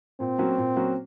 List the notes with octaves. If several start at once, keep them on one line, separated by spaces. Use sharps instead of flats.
A#2 C4
F#3 A#3 C#4 F#4
A#2
F#3 A#3 C#4 F#4